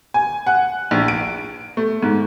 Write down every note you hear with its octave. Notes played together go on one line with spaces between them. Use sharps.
G#5
F#5
A#1
D7
A3
G#2